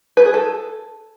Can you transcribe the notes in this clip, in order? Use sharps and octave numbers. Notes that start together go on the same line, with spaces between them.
B4
G#4
A4